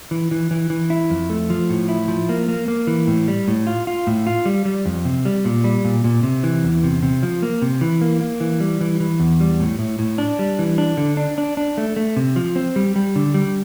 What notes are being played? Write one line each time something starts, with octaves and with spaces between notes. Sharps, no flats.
E3
E3
E3
E3
E4
F2
A3
F3
A2
E4
F3
A#3
A#3
A#3
E3
A2
G3
A2
F4
F4
A2
F4
G3
G3
F2
C3
G3
A#2
G3
A#2
A#2
C3
E3
E2
C3
C3
F3
A#3
C3
E3
A#3
A#3
E3
G3
E3
E3
E2
G3
A2
A2
A2
D4
G3
E3
D4
D3
D4
D4
D4
A3
A3
C3
F3
C4
G3
G3
D3
G3